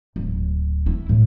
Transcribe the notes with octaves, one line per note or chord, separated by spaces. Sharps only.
D1
E4
A2